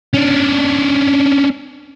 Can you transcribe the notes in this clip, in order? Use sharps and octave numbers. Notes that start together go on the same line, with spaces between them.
C#4 D4